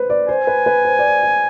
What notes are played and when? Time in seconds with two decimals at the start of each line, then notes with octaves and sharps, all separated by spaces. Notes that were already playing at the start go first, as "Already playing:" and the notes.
Already playing: B4 C5
0.10 D5
0.28 C5 G#5
0.47 B4
0.66 B4
0.85 C5
0.99 D5
1.04 C5
1.23 D5